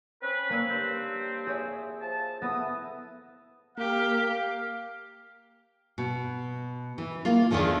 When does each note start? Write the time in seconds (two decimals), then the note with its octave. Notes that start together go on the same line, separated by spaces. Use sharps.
0.22 C4 C#4 B4
0.50 A#3 C#5 E6
0.70 G2 C4
1.47 G#4 C#5 E5
2.00 F3 A5
2.42 A3 B3 E4 D#6
3.78 A#3 G4 F5
5.98 B2
6.98 E3
7.25 A#3 F4
7.51 E2 B2 D3 D#3 F3